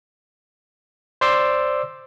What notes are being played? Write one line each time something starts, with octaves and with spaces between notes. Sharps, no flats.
C5 D5 C6 D6 E6